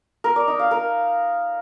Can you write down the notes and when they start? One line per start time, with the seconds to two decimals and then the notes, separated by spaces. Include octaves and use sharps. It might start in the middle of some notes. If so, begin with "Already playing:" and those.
0.24 A#4
0.36 D5
0.48 D#4
0.59 F5
0.71 A#4